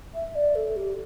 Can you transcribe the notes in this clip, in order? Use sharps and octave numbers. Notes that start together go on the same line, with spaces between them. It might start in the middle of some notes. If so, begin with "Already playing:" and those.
E5
D5
A4
G4